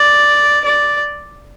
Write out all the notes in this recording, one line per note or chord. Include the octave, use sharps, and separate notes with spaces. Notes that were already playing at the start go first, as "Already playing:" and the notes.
Already playing: D5
D5